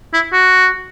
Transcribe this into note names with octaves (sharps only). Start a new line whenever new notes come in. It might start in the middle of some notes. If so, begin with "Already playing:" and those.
E4
F#4